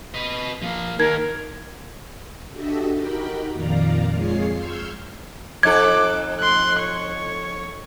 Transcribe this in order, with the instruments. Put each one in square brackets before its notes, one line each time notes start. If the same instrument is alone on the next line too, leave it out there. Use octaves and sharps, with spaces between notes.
[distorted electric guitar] B4 D#5
F3 A#3
[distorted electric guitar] D#3 A#3 [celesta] D#4 G#6 [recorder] A#4
[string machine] D4 F#4 G4 A4 D#5 E5
D#4 F#4 G4 A#4 G5 B5
F2 A#2 D#3 D5 F5 A#5
F2 G#3 F4 G#4 C#5 C7
C6 C#6 E6 F6 G6 G#6
[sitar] F2 D#4 A4 [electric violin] D6 F#6 [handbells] G#6
[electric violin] C6 F#6
C#5